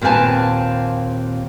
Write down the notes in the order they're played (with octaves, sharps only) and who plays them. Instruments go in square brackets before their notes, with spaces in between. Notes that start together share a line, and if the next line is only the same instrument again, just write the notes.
[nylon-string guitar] D#2 A#2 C4 B4 G#5 A5